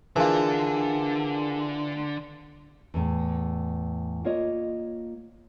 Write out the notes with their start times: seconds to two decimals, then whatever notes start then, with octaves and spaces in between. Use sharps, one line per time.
0.16 D3 E3 F4 G#4 A#4 A5
2.94 E2 A2
4.24 A#3 F4 C#5 D#5